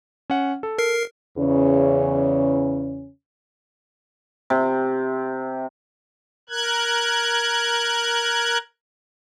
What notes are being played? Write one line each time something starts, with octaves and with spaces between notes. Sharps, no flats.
C#4 F#5
A4
A#4 C7
E2 C#3 C#4
C3
A#4 F#6 G#6